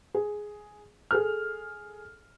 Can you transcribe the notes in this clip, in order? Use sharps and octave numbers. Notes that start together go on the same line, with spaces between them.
G#4
G#4 A4 F6